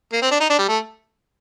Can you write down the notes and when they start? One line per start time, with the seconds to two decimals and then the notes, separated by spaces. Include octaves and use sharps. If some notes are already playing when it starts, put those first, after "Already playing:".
0.13 A#3
0.22 C4
0.31 D4
0.40 D#4
0.50 D4
0.59 G3
0.68 A3